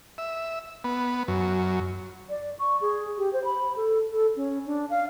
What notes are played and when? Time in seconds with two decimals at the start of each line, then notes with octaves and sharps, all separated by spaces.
0.18 E5
0.84 B3
1.28 F#2
2.30 D5
2.59 C#6
2.81 G#4
3.18 G4
3.33 C5
3.44 B5
3.77 A4
4.12 A4
4.36 C#4
4.66 D4
4.90 F5